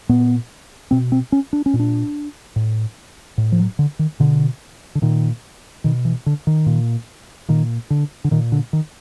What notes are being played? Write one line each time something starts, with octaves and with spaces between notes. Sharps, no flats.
A#2 B3
B2 C4
C4
C#4
D4
C#4
A#2
D4
A2
A2
F3
F#3
D3
D#3
B2 D3
D3
A#2 D#3
B2 D#3
E3
D3
D#3
A#2
A#2 D#3
D3
D3
A#2 D#3
D3
D#3